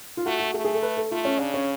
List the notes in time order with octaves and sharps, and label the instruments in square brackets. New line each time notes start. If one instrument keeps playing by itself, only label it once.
[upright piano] F4
[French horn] A3 [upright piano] F#4
[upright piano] F#4
[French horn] A3 [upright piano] G#4
[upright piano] G#4
A4
B4
A4
[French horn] A3 [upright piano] F4
[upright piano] C#4
[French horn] C#3 [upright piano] D4
[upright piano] C#4